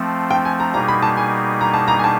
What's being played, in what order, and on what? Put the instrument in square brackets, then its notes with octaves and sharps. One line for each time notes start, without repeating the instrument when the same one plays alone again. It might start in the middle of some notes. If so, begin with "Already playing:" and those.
Already playing: [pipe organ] F3 A3 C4
[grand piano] G5
G#5
A#5
[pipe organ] B2 G3 A#3 D#4 G#4 [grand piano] A#5
[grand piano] B5
A5
G#5
A#5
A5
A#5
G#5
A5